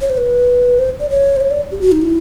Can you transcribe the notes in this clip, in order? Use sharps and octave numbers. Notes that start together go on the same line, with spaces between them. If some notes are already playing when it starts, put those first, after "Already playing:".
C#5
C5
B4
C5
D5
C#5
C5
C#5
D5
G4
F#4
D#4
E4